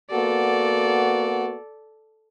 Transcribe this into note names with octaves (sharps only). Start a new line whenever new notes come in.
A#3 B3 F#4 A4 D5